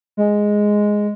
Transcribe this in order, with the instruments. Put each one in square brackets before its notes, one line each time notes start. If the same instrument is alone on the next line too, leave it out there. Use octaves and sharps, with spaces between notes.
[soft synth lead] G#3